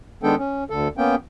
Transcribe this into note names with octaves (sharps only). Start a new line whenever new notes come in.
D#3 G#3 B3 D4 A4 G5
C#4
D2 D3 A4
A#3 B3 C#4 G5